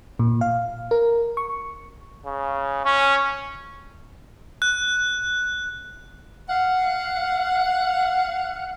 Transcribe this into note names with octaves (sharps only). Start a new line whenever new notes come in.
A#2
F5
A#4
C#6
C#3
C#4
F#6
F5 F#5